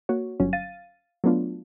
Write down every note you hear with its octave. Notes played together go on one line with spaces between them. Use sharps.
A#3 F#4 C#5
G1 F#3 C#4
F5 A6 D#7
F#3 A3 B3 D4 F4